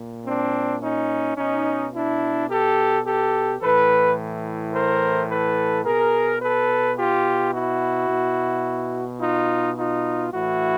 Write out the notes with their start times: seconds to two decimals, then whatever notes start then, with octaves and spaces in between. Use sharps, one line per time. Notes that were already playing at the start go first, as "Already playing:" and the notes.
Already playing: A#2
0.25 C4 D4
0.82 C#4 D#4
1.37 B2 C#4 D#4
1.93 D4 E4
2.49 G4 A4
3.05 G4 A4
3.61 A2 E3 A4 B4
4.73 A#4 C5
5.29 A4 B4
5.85 B2 G#4 A#4
6.42 A4 B4
6.97 F4 G4
7.52 E4 F#4
8.09 B2
9.20 D#4 F4
9.77 D#4 F4
10.33 A2 E3 E4 F#4